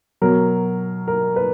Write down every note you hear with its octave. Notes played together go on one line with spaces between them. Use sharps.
B2 F#3 A#4
A#4
B4